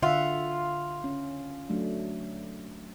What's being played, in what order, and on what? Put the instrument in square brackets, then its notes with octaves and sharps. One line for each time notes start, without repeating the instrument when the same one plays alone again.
[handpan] D3 E5 F#5 [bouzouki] F4
[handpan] C#4
F#3 A3 D4